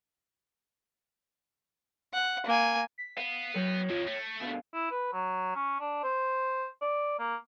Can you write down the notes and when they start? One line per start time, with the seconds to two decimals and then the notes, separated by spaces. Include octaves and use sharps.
2.14 F#5
2.46 A#3 G#5
2.98 B6
3.18 B3 F5
3.56 F#3 C#5 G5
3.90 F2 D#3 F4
4.08 A3 C#7
4.41 B2 D3 F5
4.74 E4
4.91 B4
5.13 F#3
5.55 C#4
5.80 D4
6.03 C5
6.82 D5
7.19 A#3